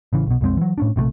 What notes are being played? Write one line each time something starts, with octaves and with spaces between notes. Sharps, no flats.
A1 C#3 E3
B1 B2
B1 F2 G#3 C4
E3 F#3
A2 C#4 D4
A#1 C3 F3 A3